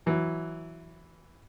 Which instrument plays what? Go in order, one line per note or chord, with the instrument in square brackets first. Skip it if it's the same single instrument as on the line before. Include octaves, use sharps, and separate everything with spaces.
[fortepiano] E3 F#3